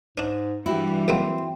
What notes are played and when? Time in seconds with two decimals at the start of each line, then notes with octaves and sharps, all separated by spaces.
0.18 G#2 C#4 D4
0.66 G2 E3 G3 E4 F#4 G4
1.08 C#2 F#3 A#3 C4